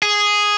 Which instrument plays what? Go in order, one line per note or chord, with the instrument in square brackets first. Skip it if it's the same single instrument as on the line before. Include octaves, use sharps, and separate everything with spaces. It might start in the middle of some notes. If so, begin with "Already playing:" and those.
[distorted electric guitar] G#4